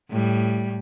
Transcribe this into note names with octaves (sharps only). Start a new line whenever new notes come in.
A2 G3